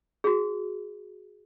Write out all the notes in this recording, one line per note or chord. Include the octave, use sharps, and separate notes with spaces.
F#4 G#4